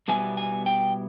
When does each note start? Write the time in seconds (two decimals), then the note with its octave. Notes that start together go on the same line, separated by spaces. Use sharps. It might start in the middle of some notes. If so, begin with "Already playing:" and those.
0.08 B2 G3 B3 E4 G#5
0.37 G#5
0.66 G5